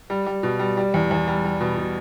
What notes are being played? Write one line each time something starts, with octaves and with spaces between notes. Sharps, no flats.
G3
G3
B2
G3
G3
E2
E2
G3
G3
B2
B2